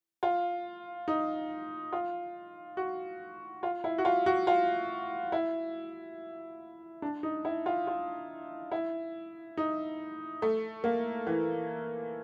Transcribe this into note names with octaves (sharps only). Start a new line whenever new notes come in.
F4
D#4
F4
F#4
F4
E4
F#4
F4
F#4
F4
E4
D4
D#4
E4
F4
F4
E4
D#4
A3
A#3
E3